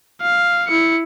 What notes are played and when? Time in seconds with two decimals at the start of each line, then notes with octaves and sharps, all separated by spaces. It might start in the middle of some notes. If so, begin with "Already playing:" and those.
0.22 F5
0.68 E4 C#7